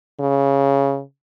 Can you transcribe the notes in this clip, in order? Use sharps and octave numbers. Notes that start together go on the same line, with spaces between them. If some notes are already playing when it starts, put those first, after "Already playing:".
C#3